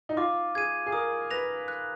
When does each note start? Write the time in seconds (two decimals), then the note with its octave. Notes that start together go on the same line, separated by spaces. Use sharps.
0.09 D#4
0.17 F4 D6
0.55 G#4 G#6 D#7
0.86 G#4
0.92 A#4 D#6
1.31 B4 A#6 F7
1.68 F#6